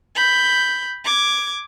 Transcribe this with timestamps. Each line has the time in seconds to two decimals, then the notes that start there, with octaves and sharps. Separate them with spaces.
0.15 B5 G6
1.04 D6 G#6